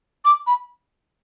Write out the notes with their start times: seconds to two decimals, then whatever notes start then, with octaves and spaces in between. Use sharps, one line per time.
0.25 D6
0.47 B5